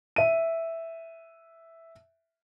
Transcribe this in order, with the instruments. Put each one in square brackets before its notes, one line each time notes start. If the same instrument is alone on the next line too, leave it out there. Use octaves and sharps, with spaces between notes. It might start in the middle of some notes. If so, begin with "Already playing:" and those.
[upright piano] E5 D#7